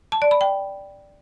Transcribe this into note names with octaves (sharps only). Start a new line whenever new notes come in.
A5
D5
B5
G5